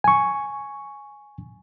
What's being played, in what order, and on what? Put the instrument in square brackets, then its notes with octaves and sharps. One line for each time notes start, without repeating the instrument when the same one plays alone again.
[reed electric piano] G#5 C#6